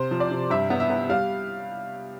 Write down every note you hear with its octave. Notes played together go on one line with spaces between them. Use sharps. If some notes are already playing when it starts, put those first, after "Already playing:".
Already playing: C3 C5
F3
D5
C3
G2 E5
B3
E5
B3
G3 F5